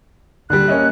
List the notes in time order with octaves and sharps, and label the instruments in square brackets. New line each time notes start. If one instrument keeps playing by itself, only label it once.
[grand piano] D3 G3 [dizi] F#6
[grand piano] A#3 C#4 D#5